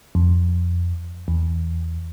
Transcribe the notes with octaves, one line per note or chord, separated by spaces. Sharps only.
F2
E2